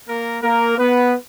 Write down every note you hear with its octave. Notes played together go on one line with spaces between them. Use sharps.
A#3 A#4
A#3 A#4
B3 B4